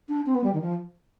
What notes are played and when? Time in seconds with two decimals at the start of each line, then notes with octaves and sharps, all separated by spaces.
0.09 D4
0.26 C4
0.35 B3
0.44 G3
0.54 D#3
0.61 F3